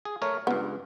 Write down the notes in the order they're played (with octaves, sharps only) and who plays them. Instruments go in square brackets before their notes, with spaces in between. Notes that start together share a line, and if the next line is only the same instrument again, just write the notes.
[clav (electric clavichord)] G#4
A3 A#4 C#5
[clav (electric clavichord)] C#2 G2 [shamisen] B3